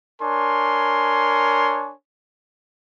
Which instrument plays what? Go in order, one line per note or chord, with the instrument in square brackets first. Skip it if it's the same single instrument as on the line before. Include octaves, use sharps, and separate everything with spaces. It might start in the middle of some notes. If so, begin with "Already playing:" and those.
[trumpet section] D4 A#4 C#5 G#5 C6